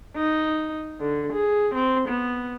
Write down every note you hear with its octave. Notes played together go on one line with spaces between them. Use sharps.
D#4
D3
G#4
C4
B3